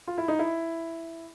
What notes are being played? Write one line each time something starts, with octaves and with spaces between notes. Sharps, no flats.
F4
E4
D#4
E4